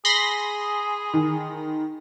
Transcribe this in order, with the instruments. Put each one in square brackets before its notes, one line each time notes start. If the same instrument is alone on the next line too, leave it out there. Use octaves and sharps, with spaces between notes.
[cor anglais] G#4 [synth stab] B5 C6 A#6
[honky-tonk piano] D#3